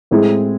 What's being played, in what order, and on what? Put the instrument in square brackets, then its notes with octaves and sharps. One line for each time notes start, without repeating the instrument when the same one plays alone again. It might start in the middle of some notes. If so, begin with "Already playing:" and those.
[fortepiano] A2 G#3 C4 E4 G#4